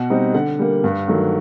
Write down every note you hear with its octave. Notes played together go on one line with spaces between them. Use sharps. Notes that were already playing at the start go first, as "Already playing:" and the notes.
Already playing: B2 F#5
G3 C4 D#4
D3 F#5
G3 A#3
G2
D#3 F#3 A3